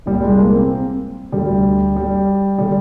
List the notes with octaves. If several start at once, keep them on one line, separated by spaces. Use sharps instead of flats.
C2 A#2 G3
G#3
A#3
C4
D2 D3 G3
G3
D3 G3